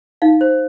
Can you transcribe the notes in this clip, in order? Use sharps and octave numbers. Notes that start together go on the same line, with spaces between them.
D#4 F5
C5